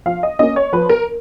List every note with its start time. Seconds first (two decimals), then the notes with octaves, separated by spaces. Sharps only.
0.06 F3 F5
0.23 D#5
0.39 A#3 C#4 D#5
0.56 C#5
0.73 F3 B4
0.89 A#4